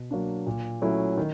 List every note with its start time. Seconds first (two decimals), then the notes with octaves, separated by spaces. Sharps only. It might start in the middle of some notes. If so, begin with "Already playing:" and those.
Already playing: B2
0.11 F#3 A#3 D4
0.46 A#2
0.82 F#3 A3 C#4 E4
1.17 D#3